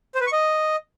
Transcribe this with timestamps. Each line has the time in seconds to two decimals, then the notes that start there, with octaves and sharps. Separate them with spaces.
0.15 C5
0.21 B4
0.27 C#6
0.33 D#5